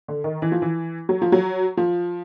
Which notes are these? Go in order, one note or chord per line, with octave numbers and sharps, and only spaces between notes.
D3
D#3
E3
F3
E3
F#3
F3
F#3
F3